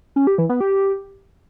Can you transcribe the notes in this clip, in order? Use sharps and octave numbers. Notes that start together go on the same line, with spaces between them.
C#4
G4
E3
B3
G4